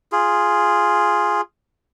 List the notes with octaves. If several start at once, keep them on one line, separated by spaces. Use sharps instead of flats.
F4 G#4